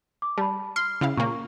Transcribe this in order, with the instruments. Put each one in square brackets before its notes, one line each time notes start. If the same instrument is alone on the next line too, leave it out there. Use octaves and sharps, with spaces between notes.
[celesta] D6
[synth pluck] G3 [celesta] A5 B5
[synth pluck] C6 [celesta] F6 C7
[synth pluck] C#3 E4 F5
[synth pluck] A#2 C#3 A#3 [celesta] C#6